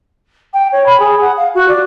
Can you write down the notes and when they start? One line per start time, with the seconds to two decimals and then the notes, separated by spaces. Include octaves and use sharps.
0.54 G5
0.72 C#5
0.86 B5
1.00 G#4
1.21 F#5
1.37 F5
1.55 F#4
1.68 D5